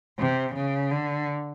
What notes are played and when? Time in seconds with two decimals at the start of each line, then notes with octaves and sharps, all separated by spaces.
0.19 C3
0.56 C#3
0.91 D3